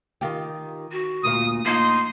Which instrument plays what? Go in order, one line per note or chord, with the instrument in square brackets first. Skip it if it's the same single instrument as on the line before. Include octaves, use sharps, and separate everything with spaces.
[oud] D#3 F4 G4
[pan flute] F#4
[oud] D2 A#2 F5 [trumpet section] D#6
[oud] F3 [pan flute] A#3 [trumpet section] D#4 C6